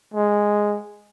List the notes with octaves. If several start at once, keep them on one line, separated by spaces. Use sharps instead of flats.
G#3